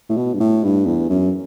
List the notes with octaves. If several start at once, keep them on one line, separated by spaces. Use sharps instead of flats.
A2
B2
G2
A2
G2
E2
F#2